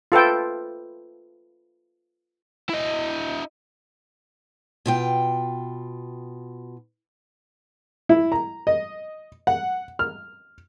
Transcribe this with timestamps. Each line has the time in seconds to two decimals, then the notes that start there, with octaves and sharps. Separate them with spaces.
0.12 F4 A4 B4 G5
2.69 E4 D#5
4.86 B2 F4 G5
8.09 E4
8.32 A#5
8.67 D#5
9.47 F#5
9.99 F6